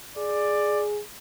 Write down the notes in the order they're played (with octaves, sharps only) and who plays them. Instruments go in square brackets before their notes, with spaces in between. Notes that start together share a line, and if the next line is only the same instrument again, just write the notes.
[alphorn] G#4 [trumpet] D5